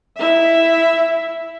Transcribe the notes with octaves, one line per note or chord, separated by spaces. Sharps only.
E4 E5